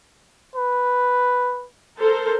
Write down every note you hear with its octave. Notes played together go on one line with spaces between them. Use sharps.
B4
A4 A#4 C5